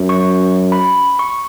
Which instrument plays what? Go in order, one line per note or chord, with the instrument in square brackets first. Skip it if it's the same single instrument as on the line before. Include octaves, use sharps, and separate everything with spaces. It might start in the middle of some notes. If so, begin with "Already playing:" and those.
Already playing: [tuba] F#2
[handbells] C#6
B5
C#6